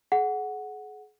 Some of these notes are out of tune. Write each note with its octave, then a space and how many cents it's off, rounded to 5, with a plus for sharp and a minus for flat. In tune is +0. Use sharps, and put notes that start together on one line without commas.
G#4 +35 F#5 +0